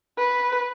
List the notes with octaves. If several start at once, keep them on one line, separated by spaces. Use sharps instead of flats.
B4